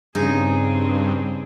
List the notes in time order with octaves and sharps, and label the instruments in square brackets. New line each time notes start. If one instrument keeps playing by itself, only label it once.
[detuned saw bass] G2 [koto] C#3 D#4 [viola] C4 G#4